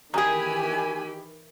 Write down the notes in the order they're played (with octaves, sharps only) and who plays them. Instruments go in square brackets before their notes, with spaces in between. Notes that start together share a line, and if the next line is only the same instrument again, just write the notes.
[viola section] D#3 E3 B5 [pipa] D#4 G#4 [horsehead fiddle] G4 [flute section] G#5